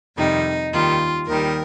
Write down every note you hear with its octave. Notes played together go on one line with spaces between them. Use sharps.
F2 C3 D#3 G3 D#4
D#2 D#3 G3 F4
D#2 D#3 G3 A#4